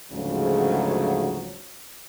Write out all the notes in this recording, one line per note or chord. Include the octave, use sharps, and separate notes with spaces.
D2 G#2 C#3 F3 F#3